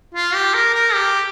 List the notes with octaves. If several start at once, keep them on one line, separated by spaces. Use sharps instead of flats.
F4
G4
A#4
A#4
G4